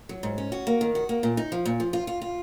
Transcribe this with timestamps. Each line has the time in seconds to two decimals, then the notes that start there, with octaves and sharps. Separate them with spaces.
0.09 F#3
0.23 G#2
0.38 C#4
0.52 F#4
0.67 A#3
0.81 D#3
0.95 F#4
1.09 A#3
1.23 A#2
1.37 D#4
1.52 F3
1.66 A#2
1.80 F3
1.93 F4
2.07 F4
2.22 F4